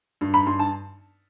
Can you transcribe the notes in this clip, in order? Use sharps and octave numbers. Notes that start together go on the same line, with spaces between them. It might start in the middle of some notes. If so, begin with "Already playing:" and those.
G2
B5
G2 C6
A5